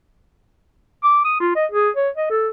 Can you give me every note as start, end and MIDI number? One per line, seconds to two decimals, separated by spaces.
1.04 1.24 86
1.25 1.39 87
1.40 1.51 65
1.56 1.66 75
1.72 1.90 68
1.97 2.10 73
2.17 2.28 75
2.31 2.49 69